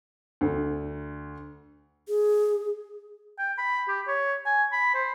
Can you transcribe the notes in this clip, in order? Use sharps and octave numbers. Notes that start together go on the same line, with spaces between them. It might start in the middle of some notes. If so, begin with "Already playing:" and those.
D2
G#4
G5
B5
G4
C#5
G#5
B5
C5